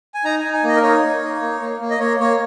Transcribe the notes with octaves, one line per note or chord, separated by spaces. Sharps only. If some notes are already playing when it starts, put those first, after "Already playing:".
G#5
D#4 A#5
D#4 G#5
G#5
A#3 D#5
A#4
D#4 C#5
A#3
D#4
A#3
A#3
A#3
D#5
A#3 C#5
A#3 C#5